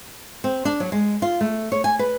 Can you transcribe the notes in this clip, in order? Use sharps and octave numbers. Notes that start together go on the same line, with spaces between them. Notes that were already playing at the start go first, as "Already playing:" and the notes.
C4
D4
F#3
G#3
F4
A3
C#5
G#5
B4